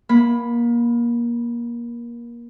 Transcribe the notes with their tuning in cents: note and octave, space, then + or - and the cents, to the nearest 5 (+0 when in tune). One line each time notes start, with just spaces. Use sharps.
A#3 +25 B5 +0